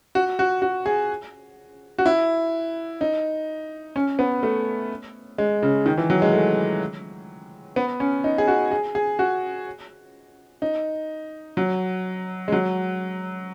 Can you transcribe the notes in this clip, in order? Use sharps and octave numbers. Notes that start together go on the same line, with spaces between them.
F#4
F#4
F#4
G#4
F#4
E4
D#4
C#4
B3
A3
G#3
C#3
D#3
E3
F#3
G#3
A3
B3
C#4
D#4
G#4
F#4
G#4
G#4
F#4
D#4
F#3
G#3
F#3